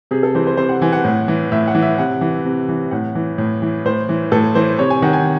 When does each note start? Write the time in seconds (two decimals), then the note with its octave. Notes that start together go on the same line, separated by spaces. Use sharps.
0.11 C3 G#4
0.23 A4
0.35 E3 C5
0.47 C5
0.57 C3 C5
0.69 F#5
0.82 E3 G#5
0.93 F#5
1.04 A2
1.28 E3
1.52 A2 E5
1.68 F#5
1.75 E3
1.82 E5
1.98 C3 F#5
2.21 E3
2.45 C3
2.69 E3
2.91 A2 F#5
3.15 E3
3.38 A2
3.62 E3
3.85 A2 C5
4.09 E3
4.32 A2 A4
4.55 E3 C5
4.79 C3 C#5
4.90 G#5
5.02 D#3 F#5
5.13 G#5